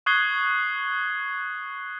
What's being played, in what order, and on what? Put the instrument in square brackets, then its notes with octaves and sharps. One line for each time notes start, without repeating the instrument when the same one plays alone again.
[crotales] C#6 D#6 F#6 G#6 C7 G7